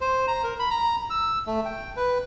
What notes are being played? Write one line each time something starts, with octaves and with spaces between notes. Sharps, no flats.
C5
A#5
A#4
B5
A#5
E6
A3
G5
B4